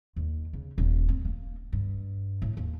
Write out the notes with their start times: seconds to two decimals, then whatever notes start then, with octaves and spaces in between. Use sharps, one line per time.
0.16 D#2
0.53 C#3
0.78 D#1
1.09 C4
1.25 A#3
1.73 G2
2.42 A2
2.57 D#2